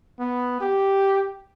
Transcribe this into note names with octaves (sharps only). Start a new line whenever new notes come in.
B3
G4